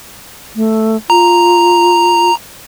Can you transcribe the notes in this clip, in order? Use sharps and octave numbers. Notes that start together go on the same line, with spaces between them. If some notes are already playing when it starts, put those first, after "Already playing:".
A3
F4 A#5